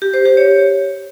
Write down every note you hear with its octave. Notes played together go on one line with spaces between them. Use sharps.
G4
C5
G4
C#5